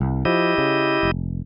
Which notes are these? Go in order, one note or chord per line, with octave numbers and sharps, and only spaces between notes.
C2
F3 E4 G4 D#5
C#3
F1